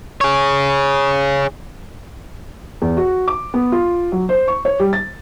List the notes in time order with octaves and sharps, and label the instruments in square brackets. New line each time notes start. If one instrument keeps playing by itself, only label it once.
[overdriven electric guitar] G#4 C#5
[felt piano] E2
F#4
D6
B3
F4
F#3
C5
C#6
C#5
G3
A6